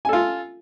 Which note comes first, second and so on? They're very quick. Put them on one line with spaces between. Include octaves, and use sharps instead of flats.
G#5 A4 F4